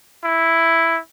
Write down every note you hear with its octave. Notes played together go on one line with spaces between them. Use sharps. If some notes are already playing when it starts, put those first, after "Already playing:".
E4